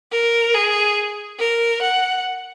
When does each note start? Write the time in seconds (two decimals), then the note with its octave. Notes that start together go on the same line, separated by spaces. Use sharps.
0.12 A#4
0.54 G#4
1.39 A#4
1.82 F#5